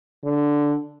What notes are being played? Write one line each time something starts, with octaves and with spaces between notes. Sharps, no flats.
D3